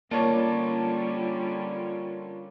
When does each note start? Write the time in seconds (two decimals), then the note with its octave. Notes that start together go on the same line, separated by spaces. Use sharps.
0.11 D3 G3 A#3 C#4 F4 C#5 D5 A5